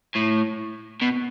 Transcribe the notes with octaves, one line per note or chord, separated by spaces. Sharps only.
A2
B2